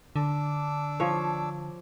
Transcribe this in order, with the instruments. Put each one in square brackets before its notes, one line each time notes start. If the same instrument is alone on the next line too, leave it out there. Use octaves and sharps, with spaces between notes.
[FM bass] D3 [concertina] D4 D6 E6
[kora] F3 C#5